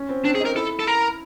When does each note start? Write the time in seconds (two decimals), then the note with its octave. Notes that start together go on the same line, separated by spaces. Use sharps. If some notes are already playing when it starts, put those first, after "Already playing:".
Already playing: C#4
0.09 C4
0.25 C4 D4
0.35 G#4
0.40 D#4
0.45 A#4
0.56 E4 A4
0.79 A4
0.87 A#4